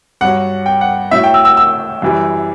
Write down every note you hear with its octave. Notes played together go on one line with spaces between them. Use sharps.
G2 F#3 F#5
G5
F#5
A2 F#3 E5
G5
E6
E6
E6
F#2 E3 G3